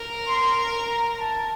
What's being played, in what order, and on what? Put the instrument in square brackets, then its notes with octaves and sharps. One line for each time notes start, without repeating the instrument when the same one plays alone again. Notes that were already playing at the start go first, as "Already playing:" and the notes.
Already playing: [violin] A#4
[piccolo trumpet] C6
A#5
A5